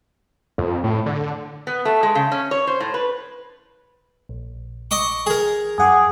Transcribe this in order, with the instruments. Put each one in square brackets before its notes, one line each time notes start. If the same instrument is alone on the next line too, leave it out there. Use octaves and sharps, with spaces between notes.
[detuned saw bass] F2
A2
D3
[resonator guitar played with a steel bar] B3
A3
G#3
C#3
C#4
C#5
C5
A2
B4
[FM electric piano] A#1
[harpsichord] D#5 C#6 D6
G#4 A#4
[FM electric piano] F#2 F#5 D6 [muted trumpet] G#4